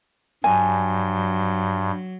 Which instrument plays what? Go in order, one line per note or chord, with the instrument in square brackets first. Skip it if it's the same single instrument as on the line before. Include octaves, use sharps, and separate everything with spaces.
[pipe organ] G2 [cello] F#3 [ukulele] G#5